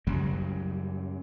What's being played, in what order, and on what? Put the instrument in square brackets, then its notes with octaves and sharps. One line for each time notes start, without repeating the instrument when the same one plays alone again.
[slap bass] F#2 C#3 F#3 G3